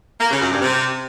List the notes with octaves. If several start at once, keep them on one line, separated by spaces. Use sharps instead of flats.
A#3
C#3
F#2
G2
C3